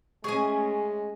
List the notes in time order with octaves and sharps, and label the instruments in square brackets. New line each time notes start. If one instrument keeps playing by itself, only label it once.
[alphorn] G#3 [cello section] A3 C#4 [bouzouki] G#4 D#5 G#5 [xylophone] C#6